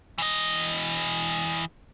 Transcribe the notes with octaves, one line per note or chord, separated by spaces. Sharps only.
E3 D#5